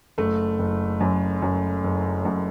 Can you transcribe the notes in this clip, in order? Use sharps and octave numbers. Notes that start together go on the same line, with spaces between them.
F#1 A3
F#1
F#2
F#2
F#1
F#2